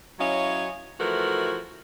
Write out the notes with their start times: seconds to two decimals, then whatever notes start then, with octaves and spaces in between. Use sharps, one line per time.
0.19 F#3 C#4 E4 C#5 D#5 F5
1.00 E3 F3 A3 F#4 A#4